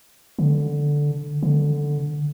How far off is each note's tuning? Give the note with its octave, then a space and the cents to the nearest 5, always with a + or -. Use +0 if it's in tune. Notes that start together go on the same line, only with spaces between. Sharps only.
D3 -5
D3 +0